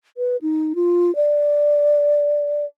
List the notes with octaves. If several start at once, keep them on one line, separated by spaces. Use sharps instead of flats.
B4
D#4
F4
D5